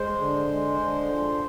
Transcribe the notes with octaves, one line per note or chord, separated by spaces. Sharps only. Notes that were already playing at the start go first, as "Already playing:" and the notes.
Already playing: G#3 C5
D3
G#3
D3
F3